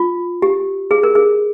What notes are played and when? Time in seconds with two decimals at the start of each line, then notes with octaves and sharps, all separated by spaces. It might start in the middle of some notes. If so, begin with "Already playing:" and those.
Already playing: F4
0.42 G4
0.91 G#4
1.03 A#4
1.15 G#4